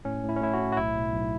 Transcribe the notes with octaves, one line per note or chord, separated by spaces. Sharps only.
A2 C#4
A2
E4
C#4
A2 E4
F#4
A2
F#4
B1 E4
B2
B1